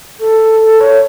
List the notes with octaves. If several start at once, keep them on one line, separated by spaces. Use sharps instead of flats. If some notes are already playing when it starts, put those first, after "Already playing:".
A4
A4
C#5